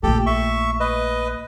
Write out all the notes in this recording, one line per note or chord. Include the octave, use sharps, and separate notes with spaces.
A#1 A3 G4 A4
E5 C#6
B4 D#5